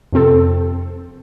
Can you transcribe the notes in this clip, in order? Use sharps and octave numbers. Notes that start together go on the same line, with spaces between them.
F2 C3 C4 A4